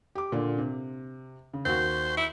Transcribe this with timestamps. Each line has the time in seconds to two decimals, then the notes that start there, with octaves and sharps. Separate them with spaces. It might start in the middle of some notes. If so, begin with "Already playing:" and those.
0.15 G4 D6
0.32 A#2 D3
0.58 C3
1.53 C#3
1.65 D#2 F#4 C5
2.17 E4